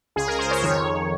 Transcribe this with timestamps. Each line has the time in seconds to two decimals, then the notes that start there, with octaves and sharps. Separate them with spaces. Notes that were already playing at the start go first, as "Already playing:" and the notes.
0.16 C#2 C#3 G#4
0.28 A#4
0.39 C5
0.51 C#5
0.62 F2 D#3 C#5